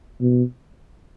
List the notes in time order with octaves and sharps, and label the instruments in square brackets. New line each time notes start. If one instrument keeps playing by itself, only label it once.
[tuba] B2